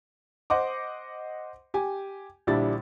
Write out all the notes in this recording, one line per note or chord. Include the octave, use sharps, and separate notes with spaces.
C5 D#5 F#5 C6 D6
G4 G#5
A#1 D3 G3 D4 E4 A6